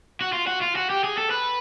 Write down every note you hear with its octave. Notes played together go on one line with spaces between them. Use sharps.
F#4
F4
F#4
F4
F#4
G4
G#4
A4
B4